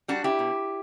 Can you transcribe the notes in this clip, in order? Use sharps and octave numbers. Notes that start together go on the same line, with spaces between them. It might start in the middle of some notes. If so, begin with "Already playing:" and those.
G3 D4 F#4
E4 G4
B2